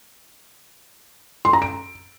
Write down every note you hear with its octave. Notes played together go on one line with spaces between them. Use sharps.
C6
A#5
D7